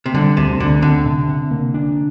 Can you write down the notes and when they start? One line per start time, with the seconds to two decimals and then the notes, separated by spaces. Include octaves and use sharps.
0.06 C3
0.14 D3 G3
0.37 D2 C3
0.60 D2 D3
0.82 D3 C4
1.06 C3
1.29 C3
1.51 A#3
1.74 D4